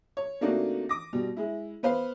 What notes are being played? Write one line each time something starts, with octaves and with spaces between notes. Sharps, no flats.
C#5
C3 A3 A#3 D4 D#4 F#4
D6 D#6 A#6
B2 G3
G#3 E4
B3 B4 C5 F5